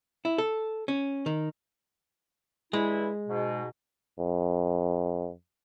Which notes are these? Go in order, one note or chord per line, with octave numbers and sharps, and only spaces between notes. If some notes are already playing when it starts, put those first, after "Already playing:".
E4
A4
C#4
D#3
G2 E3 G#3 E4
G#2 B2
F2